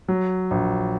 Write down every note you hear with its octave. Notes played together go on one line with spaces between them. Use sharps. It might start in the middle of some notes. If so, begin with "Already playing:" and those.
F#3
A#1